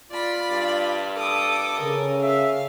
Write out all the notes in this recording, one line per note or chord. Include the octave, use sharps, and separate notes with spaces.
F4 D5 B5
G2
A4 D6 D#6
C#3 A#4
E5 F5